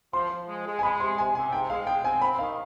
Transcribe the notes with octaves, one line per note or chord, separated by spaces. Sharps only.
F3 C6
F3
G#3
G#3
G#5
G#3 B5
C3 C6
C3 G#5
C3 G#5
G#2 G5
G#3 F5
G#3 G5
C4 G#5
C4 B5
D#3 F5